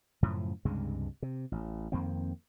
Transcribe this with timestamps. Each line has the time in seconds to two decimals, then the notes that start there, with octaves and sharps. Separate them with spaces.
0.22 F#2 A2 C#3 F3
0.65 C#2 G2 C3 G#3
1.22 C3
1.52 A1
1.92 F2 D#3 A#3 C4